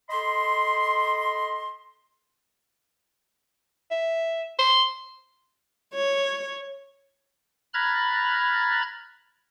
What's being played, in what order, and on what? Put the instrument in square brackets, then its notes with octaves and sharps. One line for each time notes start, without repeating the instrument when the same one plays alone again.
[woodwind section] A4 D#5 B5 C6
[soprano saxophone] E5
C6
[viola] C#5
[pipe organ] A#5 B5 F6 F#6 G#6 A6